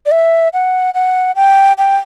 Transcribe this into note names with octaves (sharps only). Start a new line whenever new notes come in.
D5
E5
F#5
F#5
G5
G5